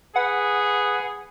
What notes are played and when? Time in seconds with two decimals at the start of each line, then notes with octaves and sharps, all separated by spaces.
0.16 G#4 B4 F#5